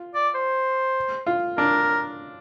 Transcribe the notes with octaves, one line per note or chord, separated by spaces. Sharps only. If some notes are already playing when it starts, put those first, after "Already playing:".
Already playing: F4
D5
C5
F4
D4 A#4